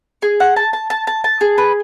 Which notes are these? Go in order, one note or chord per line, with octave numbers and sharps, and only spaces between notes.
G#4
F#5
A5
A5
A5
A5
A5
G#4
B4